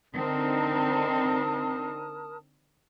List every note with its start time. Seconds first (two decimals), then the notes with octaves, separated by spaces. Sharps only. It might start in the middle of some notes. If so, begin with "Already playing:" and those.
0.14 D3 C4 D#4 A#4 A5 D#6